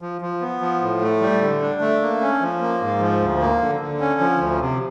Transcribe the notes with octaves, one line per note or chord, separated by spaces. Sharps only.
F3
F3
B3
F3
A2
A3
G3
D3
D4
A3
A#3
C#4
F3
A#3
G#2
F3
D2
A#3
D3
D3
C#4
F3
D2
C3